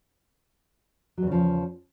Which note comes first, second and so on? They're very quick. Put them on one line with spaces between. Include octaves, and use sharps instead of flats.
F#3 E2 C#3 F3